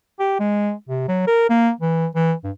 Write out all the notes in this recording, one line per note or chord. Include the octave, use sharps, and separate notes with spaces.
G4
G#3
C3
F#3
A#4
A#3
E3
E3
G2